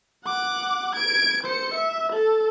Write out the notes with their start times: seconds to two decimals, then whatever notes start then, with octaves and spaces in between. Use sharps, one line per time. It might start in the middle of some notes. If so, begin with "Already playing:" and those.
0.25 F#5 D6
0.95 G#6 D7
1.43 C5 C#7
1.74 E5
2.12 A4